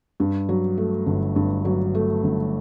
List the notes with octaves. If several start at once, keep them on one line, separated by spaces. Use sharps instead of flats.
G2
F#3
A3
G1
G2
F#3
A3
G1